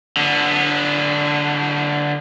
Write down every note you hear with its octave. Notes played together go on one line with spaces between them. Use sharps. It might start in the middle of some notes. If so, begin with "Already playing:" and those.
D3 B3